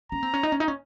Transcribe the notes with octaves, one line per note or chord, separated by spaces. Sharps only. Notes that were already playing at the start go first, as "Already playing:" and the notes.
C#4 A#5
C4
C#4
D#4
C#4
D#4
C#4